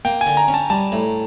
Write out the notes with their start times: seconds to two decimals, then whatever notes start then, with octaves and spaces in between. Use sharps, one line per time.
0.05 A#3 G5
0.21 G#5
0.26 D3
0.37 A#5
0.48 C#4
0.54 A5
0.70 G3 A5
0.92 A2